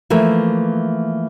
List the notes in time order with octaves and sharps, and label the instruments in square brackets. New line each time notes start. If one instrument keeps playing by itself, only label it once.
[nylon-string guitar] E3 F3 A3 A#3